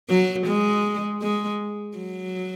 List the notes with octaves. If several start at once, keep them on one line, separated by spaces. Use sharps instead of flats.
F#3
G#3
G#3
F#3